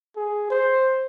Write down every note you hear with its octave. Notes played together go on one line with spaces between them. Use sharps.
G#4
C5